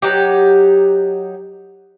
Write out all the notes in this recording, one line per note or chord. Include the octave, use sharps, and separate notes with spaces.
F#3 D#4 G4